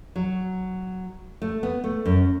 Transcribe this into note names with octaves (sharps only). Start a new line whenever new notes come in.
F#3
A3
B3
A3
F#2